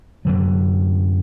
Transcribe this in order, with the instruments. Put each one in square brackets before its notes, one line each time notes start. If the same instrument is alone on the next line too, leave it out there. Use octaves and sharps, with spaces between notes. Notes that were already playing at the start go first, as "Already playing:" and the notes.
[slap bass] F#2 D3 F#3